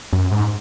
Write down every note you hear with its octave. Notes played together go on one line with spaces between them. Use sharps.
F#2
G#2